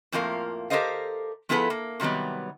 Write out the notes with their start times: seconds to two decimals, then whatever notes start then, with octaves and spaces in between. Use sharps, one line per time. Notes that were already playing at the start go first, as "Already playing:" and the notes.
0.12 F2 A2 F3 A#3 A#4 F5
0.70 G4 A4 A#4 C5 D#5 F5
1.49 F3 B3 E4 G#4 A4 B4
1.70 A#3
2.00 C3 D#3 F#3 G3 B3